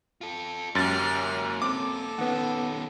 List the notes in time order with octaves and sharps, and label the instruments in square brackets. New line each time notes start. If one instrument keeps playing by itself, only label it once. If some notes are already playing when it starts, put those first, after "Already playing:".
[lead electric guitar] F4 A4
[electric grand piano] F#2 A6 [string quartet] G#3 G4 F6 [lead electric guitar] A#3 C#4
[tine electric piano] C4 [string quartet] A4 [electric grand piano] D6
[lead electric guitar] D#3 C#4 [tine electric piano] B3 F#5